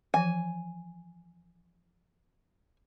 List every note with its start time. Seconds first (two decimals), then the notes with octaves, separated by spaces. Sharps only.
0.14 E3 F3 G#5